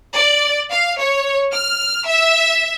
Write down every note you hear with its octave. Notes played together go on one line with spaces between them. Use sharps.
D5
F5
C#5
F6
E5